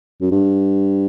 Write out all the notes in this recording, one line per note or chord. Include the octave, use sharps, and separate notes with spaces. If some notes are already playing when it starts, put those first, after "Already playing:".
F#2
G2